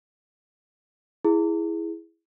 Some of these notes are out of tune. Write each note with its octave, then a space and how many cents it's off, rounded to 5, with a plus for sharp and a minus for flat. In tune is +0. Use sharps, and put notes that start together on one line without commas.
E4 +0 G#4 +0